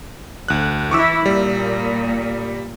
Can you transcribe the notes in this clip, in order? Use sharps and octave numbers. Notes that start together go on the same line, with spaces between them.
D2 F#6
E3 E4 C#6 D6 E6
A#2 G3